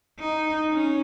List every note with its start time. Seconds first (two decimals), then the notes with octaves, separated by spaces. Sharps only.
0.19 D#4
0.72 C#4